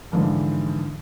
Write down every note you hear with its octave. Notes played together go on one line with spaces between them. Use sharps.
G#2 D3 E3 F3